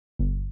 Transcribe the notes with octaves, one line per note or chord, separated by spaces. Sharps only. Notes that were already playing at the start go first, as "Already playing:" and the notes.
G1